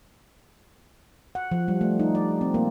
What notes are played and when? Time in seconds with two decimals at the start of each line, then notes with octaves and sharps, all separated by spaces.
1.35 F#5
1.51 F3
1.68 G3
1.81 A3
2.00 D#4
2.15 D5
2.41 C4
2.54 A#3